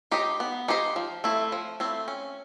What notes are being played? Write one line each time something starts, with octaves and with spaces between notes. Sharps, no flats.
D#4 G4 C5 D#5
B3
D#4 G4 C5 D#5
F3
A3 C4 E4
F3
A3 C4 E4
C#4